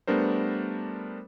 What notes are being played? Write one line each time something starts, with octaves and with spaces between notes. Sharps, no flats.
G3 A3 B3 D4 A#4 C5